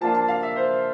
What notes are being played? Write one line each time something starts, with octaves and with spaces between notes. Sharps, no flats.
F3 A#3 D4 F4 A5
A5
F5
E5
C5